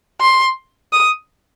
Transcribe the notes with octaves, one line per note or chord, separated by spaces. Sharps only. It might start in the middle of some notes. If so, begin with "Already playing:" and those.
C6
D#6